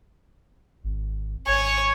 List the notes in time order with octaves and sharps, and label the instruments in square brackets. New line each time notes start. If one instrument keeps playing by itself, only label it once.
[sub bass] G#1
[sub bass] G#1 [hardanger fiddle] C#5 [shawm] G#5